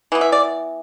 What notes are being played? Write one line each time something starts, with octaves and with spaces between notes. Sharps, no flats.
E3 B3
E5
D5